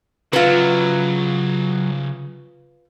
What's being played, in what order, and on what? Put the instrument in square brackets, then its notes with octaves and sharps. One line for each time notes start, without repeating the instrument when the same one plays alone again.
[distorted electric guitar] C#3 E5 [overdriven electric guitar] F#3 [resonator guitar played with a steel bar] F4 B4